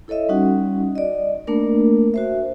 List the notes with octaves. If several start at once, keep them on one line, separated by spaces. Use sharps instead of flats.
E4 A4 C#5 D#5 E5
G3 C#4 D#4 F#4 F#5
D5 D#5
A3 A#3 D4 A#4
F#4 C5 E5